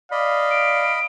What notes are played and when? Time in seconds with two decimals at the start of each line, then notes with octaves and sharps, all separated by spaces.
0.12 D5 D#5 F5 B5
0.51 D7